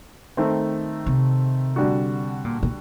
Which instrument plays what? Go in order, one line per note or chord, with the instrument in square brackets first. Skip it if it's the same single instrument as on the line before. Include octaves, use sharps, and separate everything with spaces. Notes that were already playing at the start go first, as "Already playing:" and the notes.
[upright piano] D#3 A3 C4
[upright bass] C3
[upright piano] D3 G3 D4 F#4
[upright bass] A#2
A#2